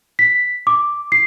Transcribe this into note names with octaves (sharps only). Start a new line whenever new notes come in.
B6
D6
C7